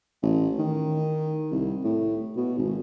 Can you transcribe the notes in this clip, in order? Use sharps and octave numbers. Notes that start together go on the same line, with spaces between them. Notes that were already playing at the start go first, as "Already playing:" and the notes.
A1
D#3
C2
A2
B2
G#1